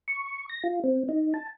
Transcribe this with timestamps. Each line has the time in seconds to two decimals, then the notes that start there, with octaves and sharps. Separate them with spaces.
0.08 C#6
0.49 A#6
0.64 F4
0.84 C4
1.09 D#4
1.34 A5